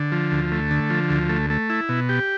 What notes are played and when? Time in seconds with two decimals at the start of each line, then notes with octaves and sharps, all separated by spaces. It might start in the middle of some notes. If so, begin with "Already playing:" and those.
Already playing: D3
0.12 F3
0.32 D2
0.52 A3
0.71 D3
0.90 F3
1.10 D2
1.29 A3
1.50 A3
1.70 E4
1.89 B2
2.09 G4